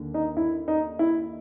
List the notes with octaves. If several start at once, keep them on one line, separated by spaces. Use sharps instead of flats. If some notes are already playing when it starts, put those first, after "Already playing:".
Already playing: D#2 D3
D#4
E4
D#4
E4